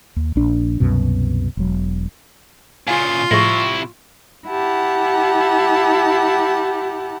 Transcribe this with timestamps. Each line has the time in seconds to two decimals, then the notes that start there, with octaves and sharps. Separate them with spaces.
0.16 D#2
0.36 A#1 D4
0.80 C2 F#2 B2
1.57 E1 F#3
2.87 A#2 C#3 F4 G#5
3.31 A2 C3 F3 G#3 E4 C#6 A#6
4.48 E4 G4 F#5 A5